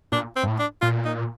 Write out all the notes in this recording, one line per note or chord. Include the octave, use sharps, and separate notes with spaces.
A#2 D4
C4
G2
A2
D4
A#2 F4
D#4